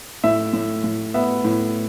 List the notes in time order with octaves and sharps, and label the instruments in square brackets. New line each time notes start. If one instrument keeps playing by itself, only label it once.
[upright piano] A2 E5
A2
A2
B3 E5
A2